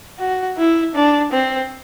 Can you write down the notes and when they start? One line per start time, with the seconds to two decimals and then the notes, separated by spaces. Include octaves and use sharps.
0.19 F#4
0.57 E4
0.95 D4
1.32 C4